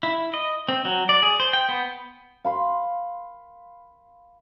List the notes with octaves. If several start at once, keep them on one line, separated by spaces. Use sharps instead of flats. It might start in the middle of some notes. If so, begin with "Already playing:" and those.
E4
D#5
C4
F#3
D5
G#4
C5
G5
B3
F5 B5 C6